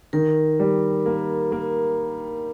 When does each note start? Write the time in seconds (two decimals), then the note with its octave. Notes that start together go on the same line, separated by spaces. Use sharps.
0.13 D#3 A#4
0.60 G3
1.06 A#3
1.52 A#3